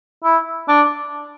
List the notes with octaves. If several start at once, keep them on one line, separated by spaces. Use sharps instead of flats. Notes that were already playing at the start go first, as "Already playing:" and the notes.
E4
D4